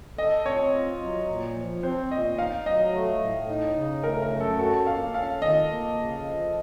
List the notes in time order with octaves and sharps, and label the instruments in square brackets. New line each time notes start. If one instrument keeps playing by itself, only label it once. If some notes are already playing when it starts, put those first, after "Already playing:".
[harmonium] A4 [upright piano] D#5
[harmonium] C4 [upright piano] C#5
[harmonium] F4
F#3
A#2
F3
[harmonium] C4 [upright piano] C5
[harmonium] A#2 [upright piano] D#5
[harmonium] D#4 [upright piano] F5
[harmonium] F#3 [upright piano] D#5
[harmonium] A3
A2
D#4
C#3
[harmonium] A3 [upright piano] A#4
[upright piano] A#4
[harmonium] F#2
[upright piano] A4
[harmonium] F#4 [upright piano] A4
[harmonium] A#3 [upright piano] F5
[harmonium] C#4 [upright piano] F5
[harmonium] D#3 [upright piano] D#5
[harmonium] A#3
C#3
F3